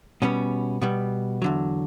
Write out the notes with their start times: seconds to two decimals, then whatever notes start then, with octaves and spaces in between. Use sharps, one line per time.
0.22 B2 G3 B3 C#4
0.82 B2 G3 B3
1.42 E2 D3 F#3